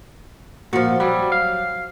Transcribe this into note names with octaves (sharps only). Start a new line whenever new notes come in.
A#2 F3 F#4
F#3 G3
F5